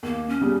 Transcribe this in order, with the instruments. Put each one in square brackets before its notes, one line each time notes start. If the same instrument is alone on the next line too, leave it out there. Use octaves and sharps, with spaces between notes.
[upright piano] D#2 [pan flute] A#3
[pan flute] C#4
[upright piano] C#3 G3